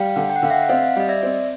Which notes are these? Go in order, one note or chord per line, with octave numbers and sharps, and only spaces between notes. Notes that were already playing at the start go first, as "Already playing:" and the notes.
Already playing: G3 F5 G5
D3
G5
F#5
D3 F5
E5 F#5
F#5
C4 D#5 F5
G3 D#5
D5 E5
C4